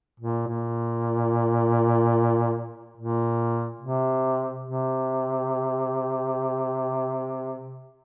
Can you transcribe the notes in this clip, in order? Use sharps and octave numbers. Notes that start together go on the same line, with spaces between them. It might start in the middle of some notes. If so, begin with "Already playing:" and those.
A#2
A#2
A#2
C3
C3